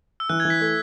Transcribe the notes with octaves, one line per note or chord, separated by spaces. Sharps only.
E6
E3 F#6
G#6
E3
B6
A3